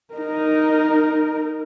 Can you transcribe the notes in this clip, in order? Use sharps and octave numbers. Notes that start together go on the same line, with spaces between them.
D#4 A#4